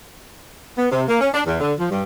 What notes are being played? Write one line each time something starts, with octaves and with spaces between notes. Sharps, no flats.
B3
C3
A#3
C#4
D4
E2
D3
F3
G2